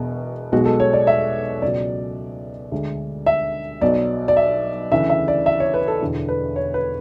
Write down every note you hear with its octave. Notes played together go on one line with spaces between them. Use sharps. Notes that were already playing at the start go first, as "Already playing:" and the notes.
Already playing: E1 E2 B2
B1 B2 G#3 F#4
A4
C#5
D5
E5
C#2 B2 F#3 D5
D2 D3 G#3
E5
B1 B2 F#3 D5
D5
E5
D2 C#3 E3 E5
E5
D5
E5
C#5
B4
A4
E1 E2 D3
B4
C#5
B4